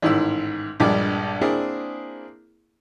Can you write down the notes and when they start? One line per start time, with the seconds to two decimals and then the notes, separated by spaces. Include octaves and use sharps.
0.02 A1 G#2 D#3 E4 E6
0.80 A#1 G2 G3 G#3 D5
1.41 A#3 C4 D4 E4 G#4 A#4